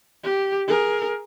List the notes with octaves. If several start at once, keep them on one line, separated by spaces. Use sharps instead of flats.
G4
G#4 A#4